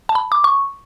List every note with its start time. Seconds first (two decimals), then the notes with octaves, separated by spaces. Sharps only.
0.09 A5
0.15 B5
0.32 D6
0.44 C#6